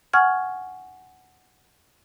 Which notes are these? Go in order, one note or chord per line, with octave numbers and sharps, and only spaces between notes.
F#5 G#5 C#6 F6 G#6